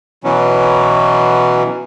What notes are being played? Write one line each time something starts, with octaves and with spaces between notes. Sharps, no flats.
B2 E3 F#3 C#4